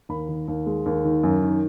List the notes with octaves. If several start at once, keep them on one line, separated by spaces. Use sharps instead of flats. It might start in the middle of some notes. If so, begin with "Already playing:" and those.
D#2 B5
D#3
D#2
G#3
D#2
D#3
F#2
D#3